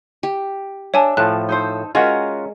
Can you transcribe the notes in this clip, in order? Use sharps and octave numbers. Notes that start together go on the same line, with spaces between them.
G4
D4 C#5 E5 G#5 A5
A2 F3 A5 F#6
D#4 A4 C5
G#3 C#4 F4 F#4 A#4 F#5